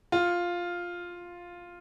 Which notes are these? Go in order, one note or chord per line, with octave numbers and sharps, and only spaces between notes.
F4